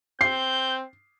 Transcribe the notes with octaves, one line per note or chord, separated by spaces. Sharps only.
C4 G6 C7